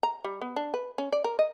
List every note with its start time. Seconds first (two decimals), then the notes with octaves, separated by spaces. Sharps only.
0.03 A#5
0.24 G3
0.41 B3
0.56 D4
0.74 B4
0.98 C#4
1.12 D5
1.24 A#4
1.39 D#5